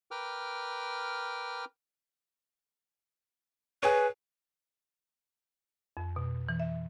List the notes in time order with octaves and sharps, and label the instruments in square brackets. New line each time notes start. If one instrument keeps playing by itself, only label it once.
[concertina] A#4 B4 G5 D6 F6
[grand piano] G#4 C#5 [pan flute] B4
[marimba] F2
B2
E3
E5